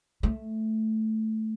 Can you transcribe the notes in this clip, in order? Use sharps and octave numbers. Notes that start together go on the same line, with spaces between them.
A3